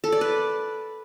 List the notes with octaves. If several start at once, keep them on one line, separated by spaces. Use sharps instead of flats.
A4
D5
B4